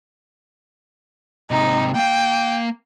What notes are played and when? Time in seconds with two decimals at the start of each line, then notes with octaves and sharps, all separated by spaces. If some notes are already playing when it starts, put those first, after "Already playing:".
1.51 G#2 C3 D#4
1.95 A#3 F5 G5